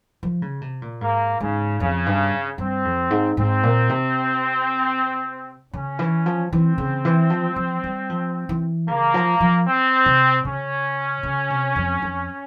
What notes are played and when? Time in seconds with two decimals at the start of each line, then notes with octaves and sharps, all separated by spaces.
0.23 F3
0.42 C#3
0.61 C3
0.82 A#2
1.01 G#2 A#3
1.40 G#2 C#3
1.80 F2 C#3
2.06 G2
2.58 G2 C4
2.85 F2
3.11 G#2
3.37 G#2 C4
3.63 A#2
3.90 C3
5.74 C#3 C#4
5.99 E3
6.26 F3
6.52 E3 C4
6.78 C#3
7.05 E3
7.30 F3
7.56 F3
7.84 G3
8.10 F3
8.49 E3
8.88 C#3 A#3
9.14 F3
9.40 F3
9.67 C4
10.06 C3
10.45 C#3 C#4
11.23 C#3
11.50 C3
11.76 F2
12.02 F2